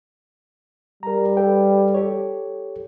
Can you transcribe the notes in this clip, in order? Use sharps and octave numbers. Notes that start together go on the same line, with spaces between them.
G3 A#4 A#5
A4 B4 G5
G4 A4 C#5